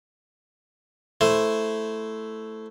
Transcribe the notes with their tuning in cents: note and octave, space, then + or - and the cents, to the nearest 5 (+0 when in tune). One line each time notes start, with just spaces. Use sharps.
A3 +0 E4 +0 C5 +0